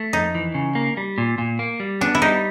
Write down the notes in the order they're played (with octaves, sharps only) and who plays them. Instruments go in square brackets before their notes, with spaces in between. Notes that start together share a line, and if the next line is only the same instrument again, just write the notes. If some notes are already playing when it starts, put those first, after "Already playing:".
Already playing: [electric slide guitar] A3
[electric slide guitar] F2 [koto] D#4
[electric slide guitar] E3
C#3
A#3
G3
A#2
A#2
A#3
G3
[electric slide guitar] B3 [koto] D4
[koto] E4
[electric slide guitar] G3 [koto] D#4